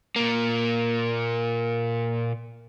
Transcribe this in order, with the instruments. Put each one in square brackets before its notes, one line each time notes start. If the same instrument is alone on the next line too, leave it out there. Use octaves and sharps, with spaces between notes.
[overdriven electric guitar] A#2 A#3